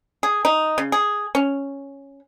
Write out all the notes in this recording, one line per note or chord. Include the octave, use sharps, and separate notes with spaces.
G#4
D#4
C#3
G#4
C#4